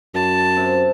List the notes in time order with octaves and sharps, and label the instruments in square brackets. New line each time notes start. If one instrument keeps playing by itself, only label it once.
[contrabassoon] F#2 [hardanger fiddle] A5
[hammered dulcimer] C3